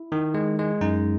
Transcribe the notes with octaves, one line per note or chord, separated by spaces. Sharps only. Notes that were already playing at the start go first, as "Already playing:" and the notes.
Already playing: E4
D#3
G#3
G#3
F#2 D#4